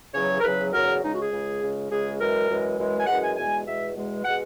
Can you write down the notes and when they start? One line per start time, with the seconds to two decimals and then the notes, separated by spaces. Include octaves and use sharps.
0.14 E2 C#3 F#3 C#5
0.40 A#4
0.43 E2 C#3 F#3 B4
0.73 E2 C#3 F#3 A#4
1.02 C#2 C#3 G#3 D#4
1.12 F#4
1.21 G#4
1.32 C#2 C#3 G#3
1.61 C#2 C#3 G#3
1.89 C#2 C#3 G#3 G#4
2.19 F#2 E3 G#3 A#4
2.49 F#2 E3 G#3
2.78 F#2 E3 G#3
2.98 G#5
3.06 F#2 E3 G#3 F#5
3.22 G#5
3.36 E2 B2 G#3 G#5
3.65 E2 B2 G#3 E5
3.95 E2 B2 G#3
4.24 B2 G#3 F#5